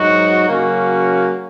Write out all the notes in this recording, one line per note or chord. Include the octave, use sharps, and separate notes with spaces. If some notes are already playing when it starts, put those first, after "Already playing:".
Already playing: G#2 F#3 D#4 F#4
C#3 F#3 A#3 C#4 F#4